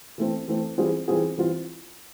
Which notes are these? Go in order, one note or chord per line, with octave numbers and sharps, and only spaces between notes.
E3 A3 C4
E3 A3 C4
E3 G3 C4 F4 G#4
E3 G3 C4 F4 G#4
E3 G3 C4 F4